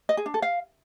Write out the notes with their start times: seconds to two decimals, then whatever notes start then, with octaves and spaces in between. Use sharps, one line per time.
0.09 D#5
0.17 G#4
0.26 D4
0.34 A4
0.42 F5